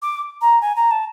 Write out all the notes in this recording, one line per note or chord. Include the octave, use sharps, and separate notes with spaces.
D6
A#5
G#5
A#5
A5